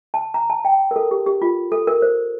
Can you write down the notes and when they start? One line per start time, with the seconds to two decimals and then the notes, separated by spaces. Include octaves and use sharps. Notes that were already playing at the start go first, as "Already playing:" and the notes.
0.14 A5
0.34 A#5
0.50 A5
0.65 G5
0.91 A#4
0.96 A4
1.11 G4
1.26 G4
1.42 F4
1.72 A4
1.87 A#4
2.02 C5